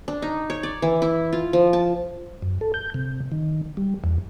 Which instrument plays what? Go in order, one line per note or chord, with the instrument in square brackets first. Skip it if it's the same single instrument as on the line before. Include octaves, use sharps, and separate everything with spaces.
[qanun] D4
D#4
C#5
D5
E3
E4
F4
F3
A5
[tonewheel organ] F#2
A4
G6
C3
D#3
G3
E2